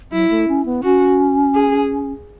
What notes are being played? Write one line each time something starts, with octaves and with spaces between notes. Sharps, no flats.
F#3 E4
A3
C#4
B3
C#4 F#4
G#4